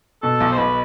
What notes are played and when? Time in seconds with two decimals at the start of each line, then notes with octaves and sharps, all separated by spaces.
0.22 B2 A4
0.40 B1
0.52 C5
0.57 B1 B4